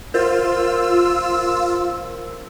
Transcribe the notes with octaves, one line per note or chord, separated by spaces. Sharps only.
F4 A#4 C5 E6